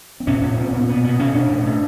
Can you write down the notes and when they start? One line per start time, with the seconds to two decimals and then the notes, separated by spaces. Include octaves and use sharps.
0.20 C4
0.27 A#2 C#4
0.42 A#2 C#4
0.57 A#2 C4
0.73 A#2 B3
0.88 B2 B3
1.04 B2 B3
1.19 B2 C#4
1.34 B2 D4
1.50 A2
1.66 A2